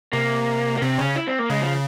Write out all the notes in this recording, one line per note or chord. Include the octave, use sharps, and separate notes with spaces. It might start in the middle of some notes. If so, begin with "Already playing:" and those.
C3 A#3
A#3
C3 C4
C#3 C#4
E4
C4
A#3
C#3 G#3
F3